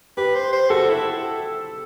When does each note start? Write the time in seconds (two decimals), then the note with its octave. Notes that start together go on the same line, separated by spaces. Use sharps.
0.17 G4 B4
0.35 C5
0.53 C5
0.70 F#4 A4
0.89 E4